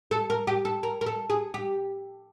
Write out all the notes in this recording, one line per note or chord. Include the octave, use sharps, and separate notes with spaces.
A4
A#4
G4
A4
A#4
A#4
A4
G#4
G4